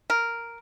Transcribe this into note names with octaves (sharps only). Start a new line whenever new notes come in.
A#4